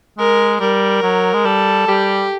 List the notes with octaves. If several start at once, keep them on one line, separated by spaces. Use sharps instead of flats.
G#3 A#4
G3 A#4
F#3
G#3
G3 A4
G3 G4